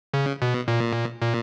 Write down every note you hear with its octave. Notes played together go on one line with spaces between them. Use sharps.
C#3
B2
A#2
A#2